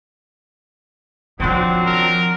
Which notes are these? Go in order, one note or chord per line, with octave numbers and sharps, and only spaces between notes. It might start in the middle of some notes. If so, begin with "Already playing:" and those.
D#3 F3 F#3 C4 D4
A#4